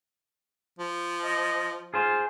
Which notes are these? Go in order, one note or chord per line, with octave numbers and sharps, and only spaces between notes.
F3
D#5
F4 G#4 C5